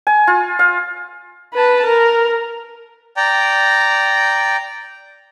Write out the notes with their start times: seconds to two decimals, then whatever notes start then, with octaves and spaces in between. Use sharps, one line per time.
0.07 G#5
0.27 F4
0.59 F5
1.54 B4 A5
1.85 A#4
3.17 D5 G5 A#5